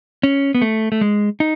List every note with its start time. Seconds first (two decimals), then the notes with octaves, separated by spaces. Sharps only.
0.23 C#4
0.55 B3
0.62 A3
0.92 A3
1.01 G#3
1.40 D#4